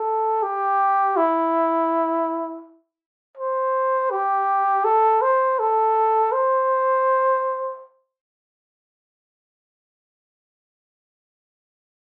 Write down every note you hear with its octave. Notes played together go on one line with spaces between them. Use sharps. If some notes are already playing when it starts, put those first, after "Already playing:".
Already playing: A4
G4
E4
C5
G4
A4
C5
A4
C5